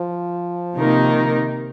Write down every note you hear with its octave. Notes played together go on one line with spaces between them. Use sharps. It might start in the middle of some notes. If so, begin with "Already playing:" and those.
Already playing: F3
C3 D#3 A#3 D#4 A#4